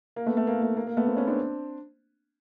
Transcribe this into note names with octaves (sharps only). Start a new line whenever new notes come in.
A#3
A3 B3
A3 B3
A#3
A3
A#3
A#3
A3 B3
A#3 C4
B3 C#4
C4 D4